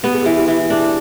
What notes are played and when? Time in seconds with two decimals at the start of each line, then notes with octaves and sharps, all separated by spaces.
0.03 B3 G4
0.13 G#4
0.22 E3 G4
0.37 G4
0.48 E3
0.70 D4 G#4